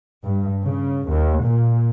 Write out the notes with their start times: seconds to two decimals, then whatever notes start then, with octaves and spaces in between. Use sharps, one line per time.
0.24 G2
0.64 C#3
1.09 D#2
1.44 A#2